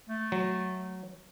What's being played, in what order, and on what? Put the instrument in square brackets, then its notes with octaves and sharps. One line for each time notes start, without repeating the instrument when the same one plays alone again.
[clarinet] A3
[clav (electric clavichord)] F#3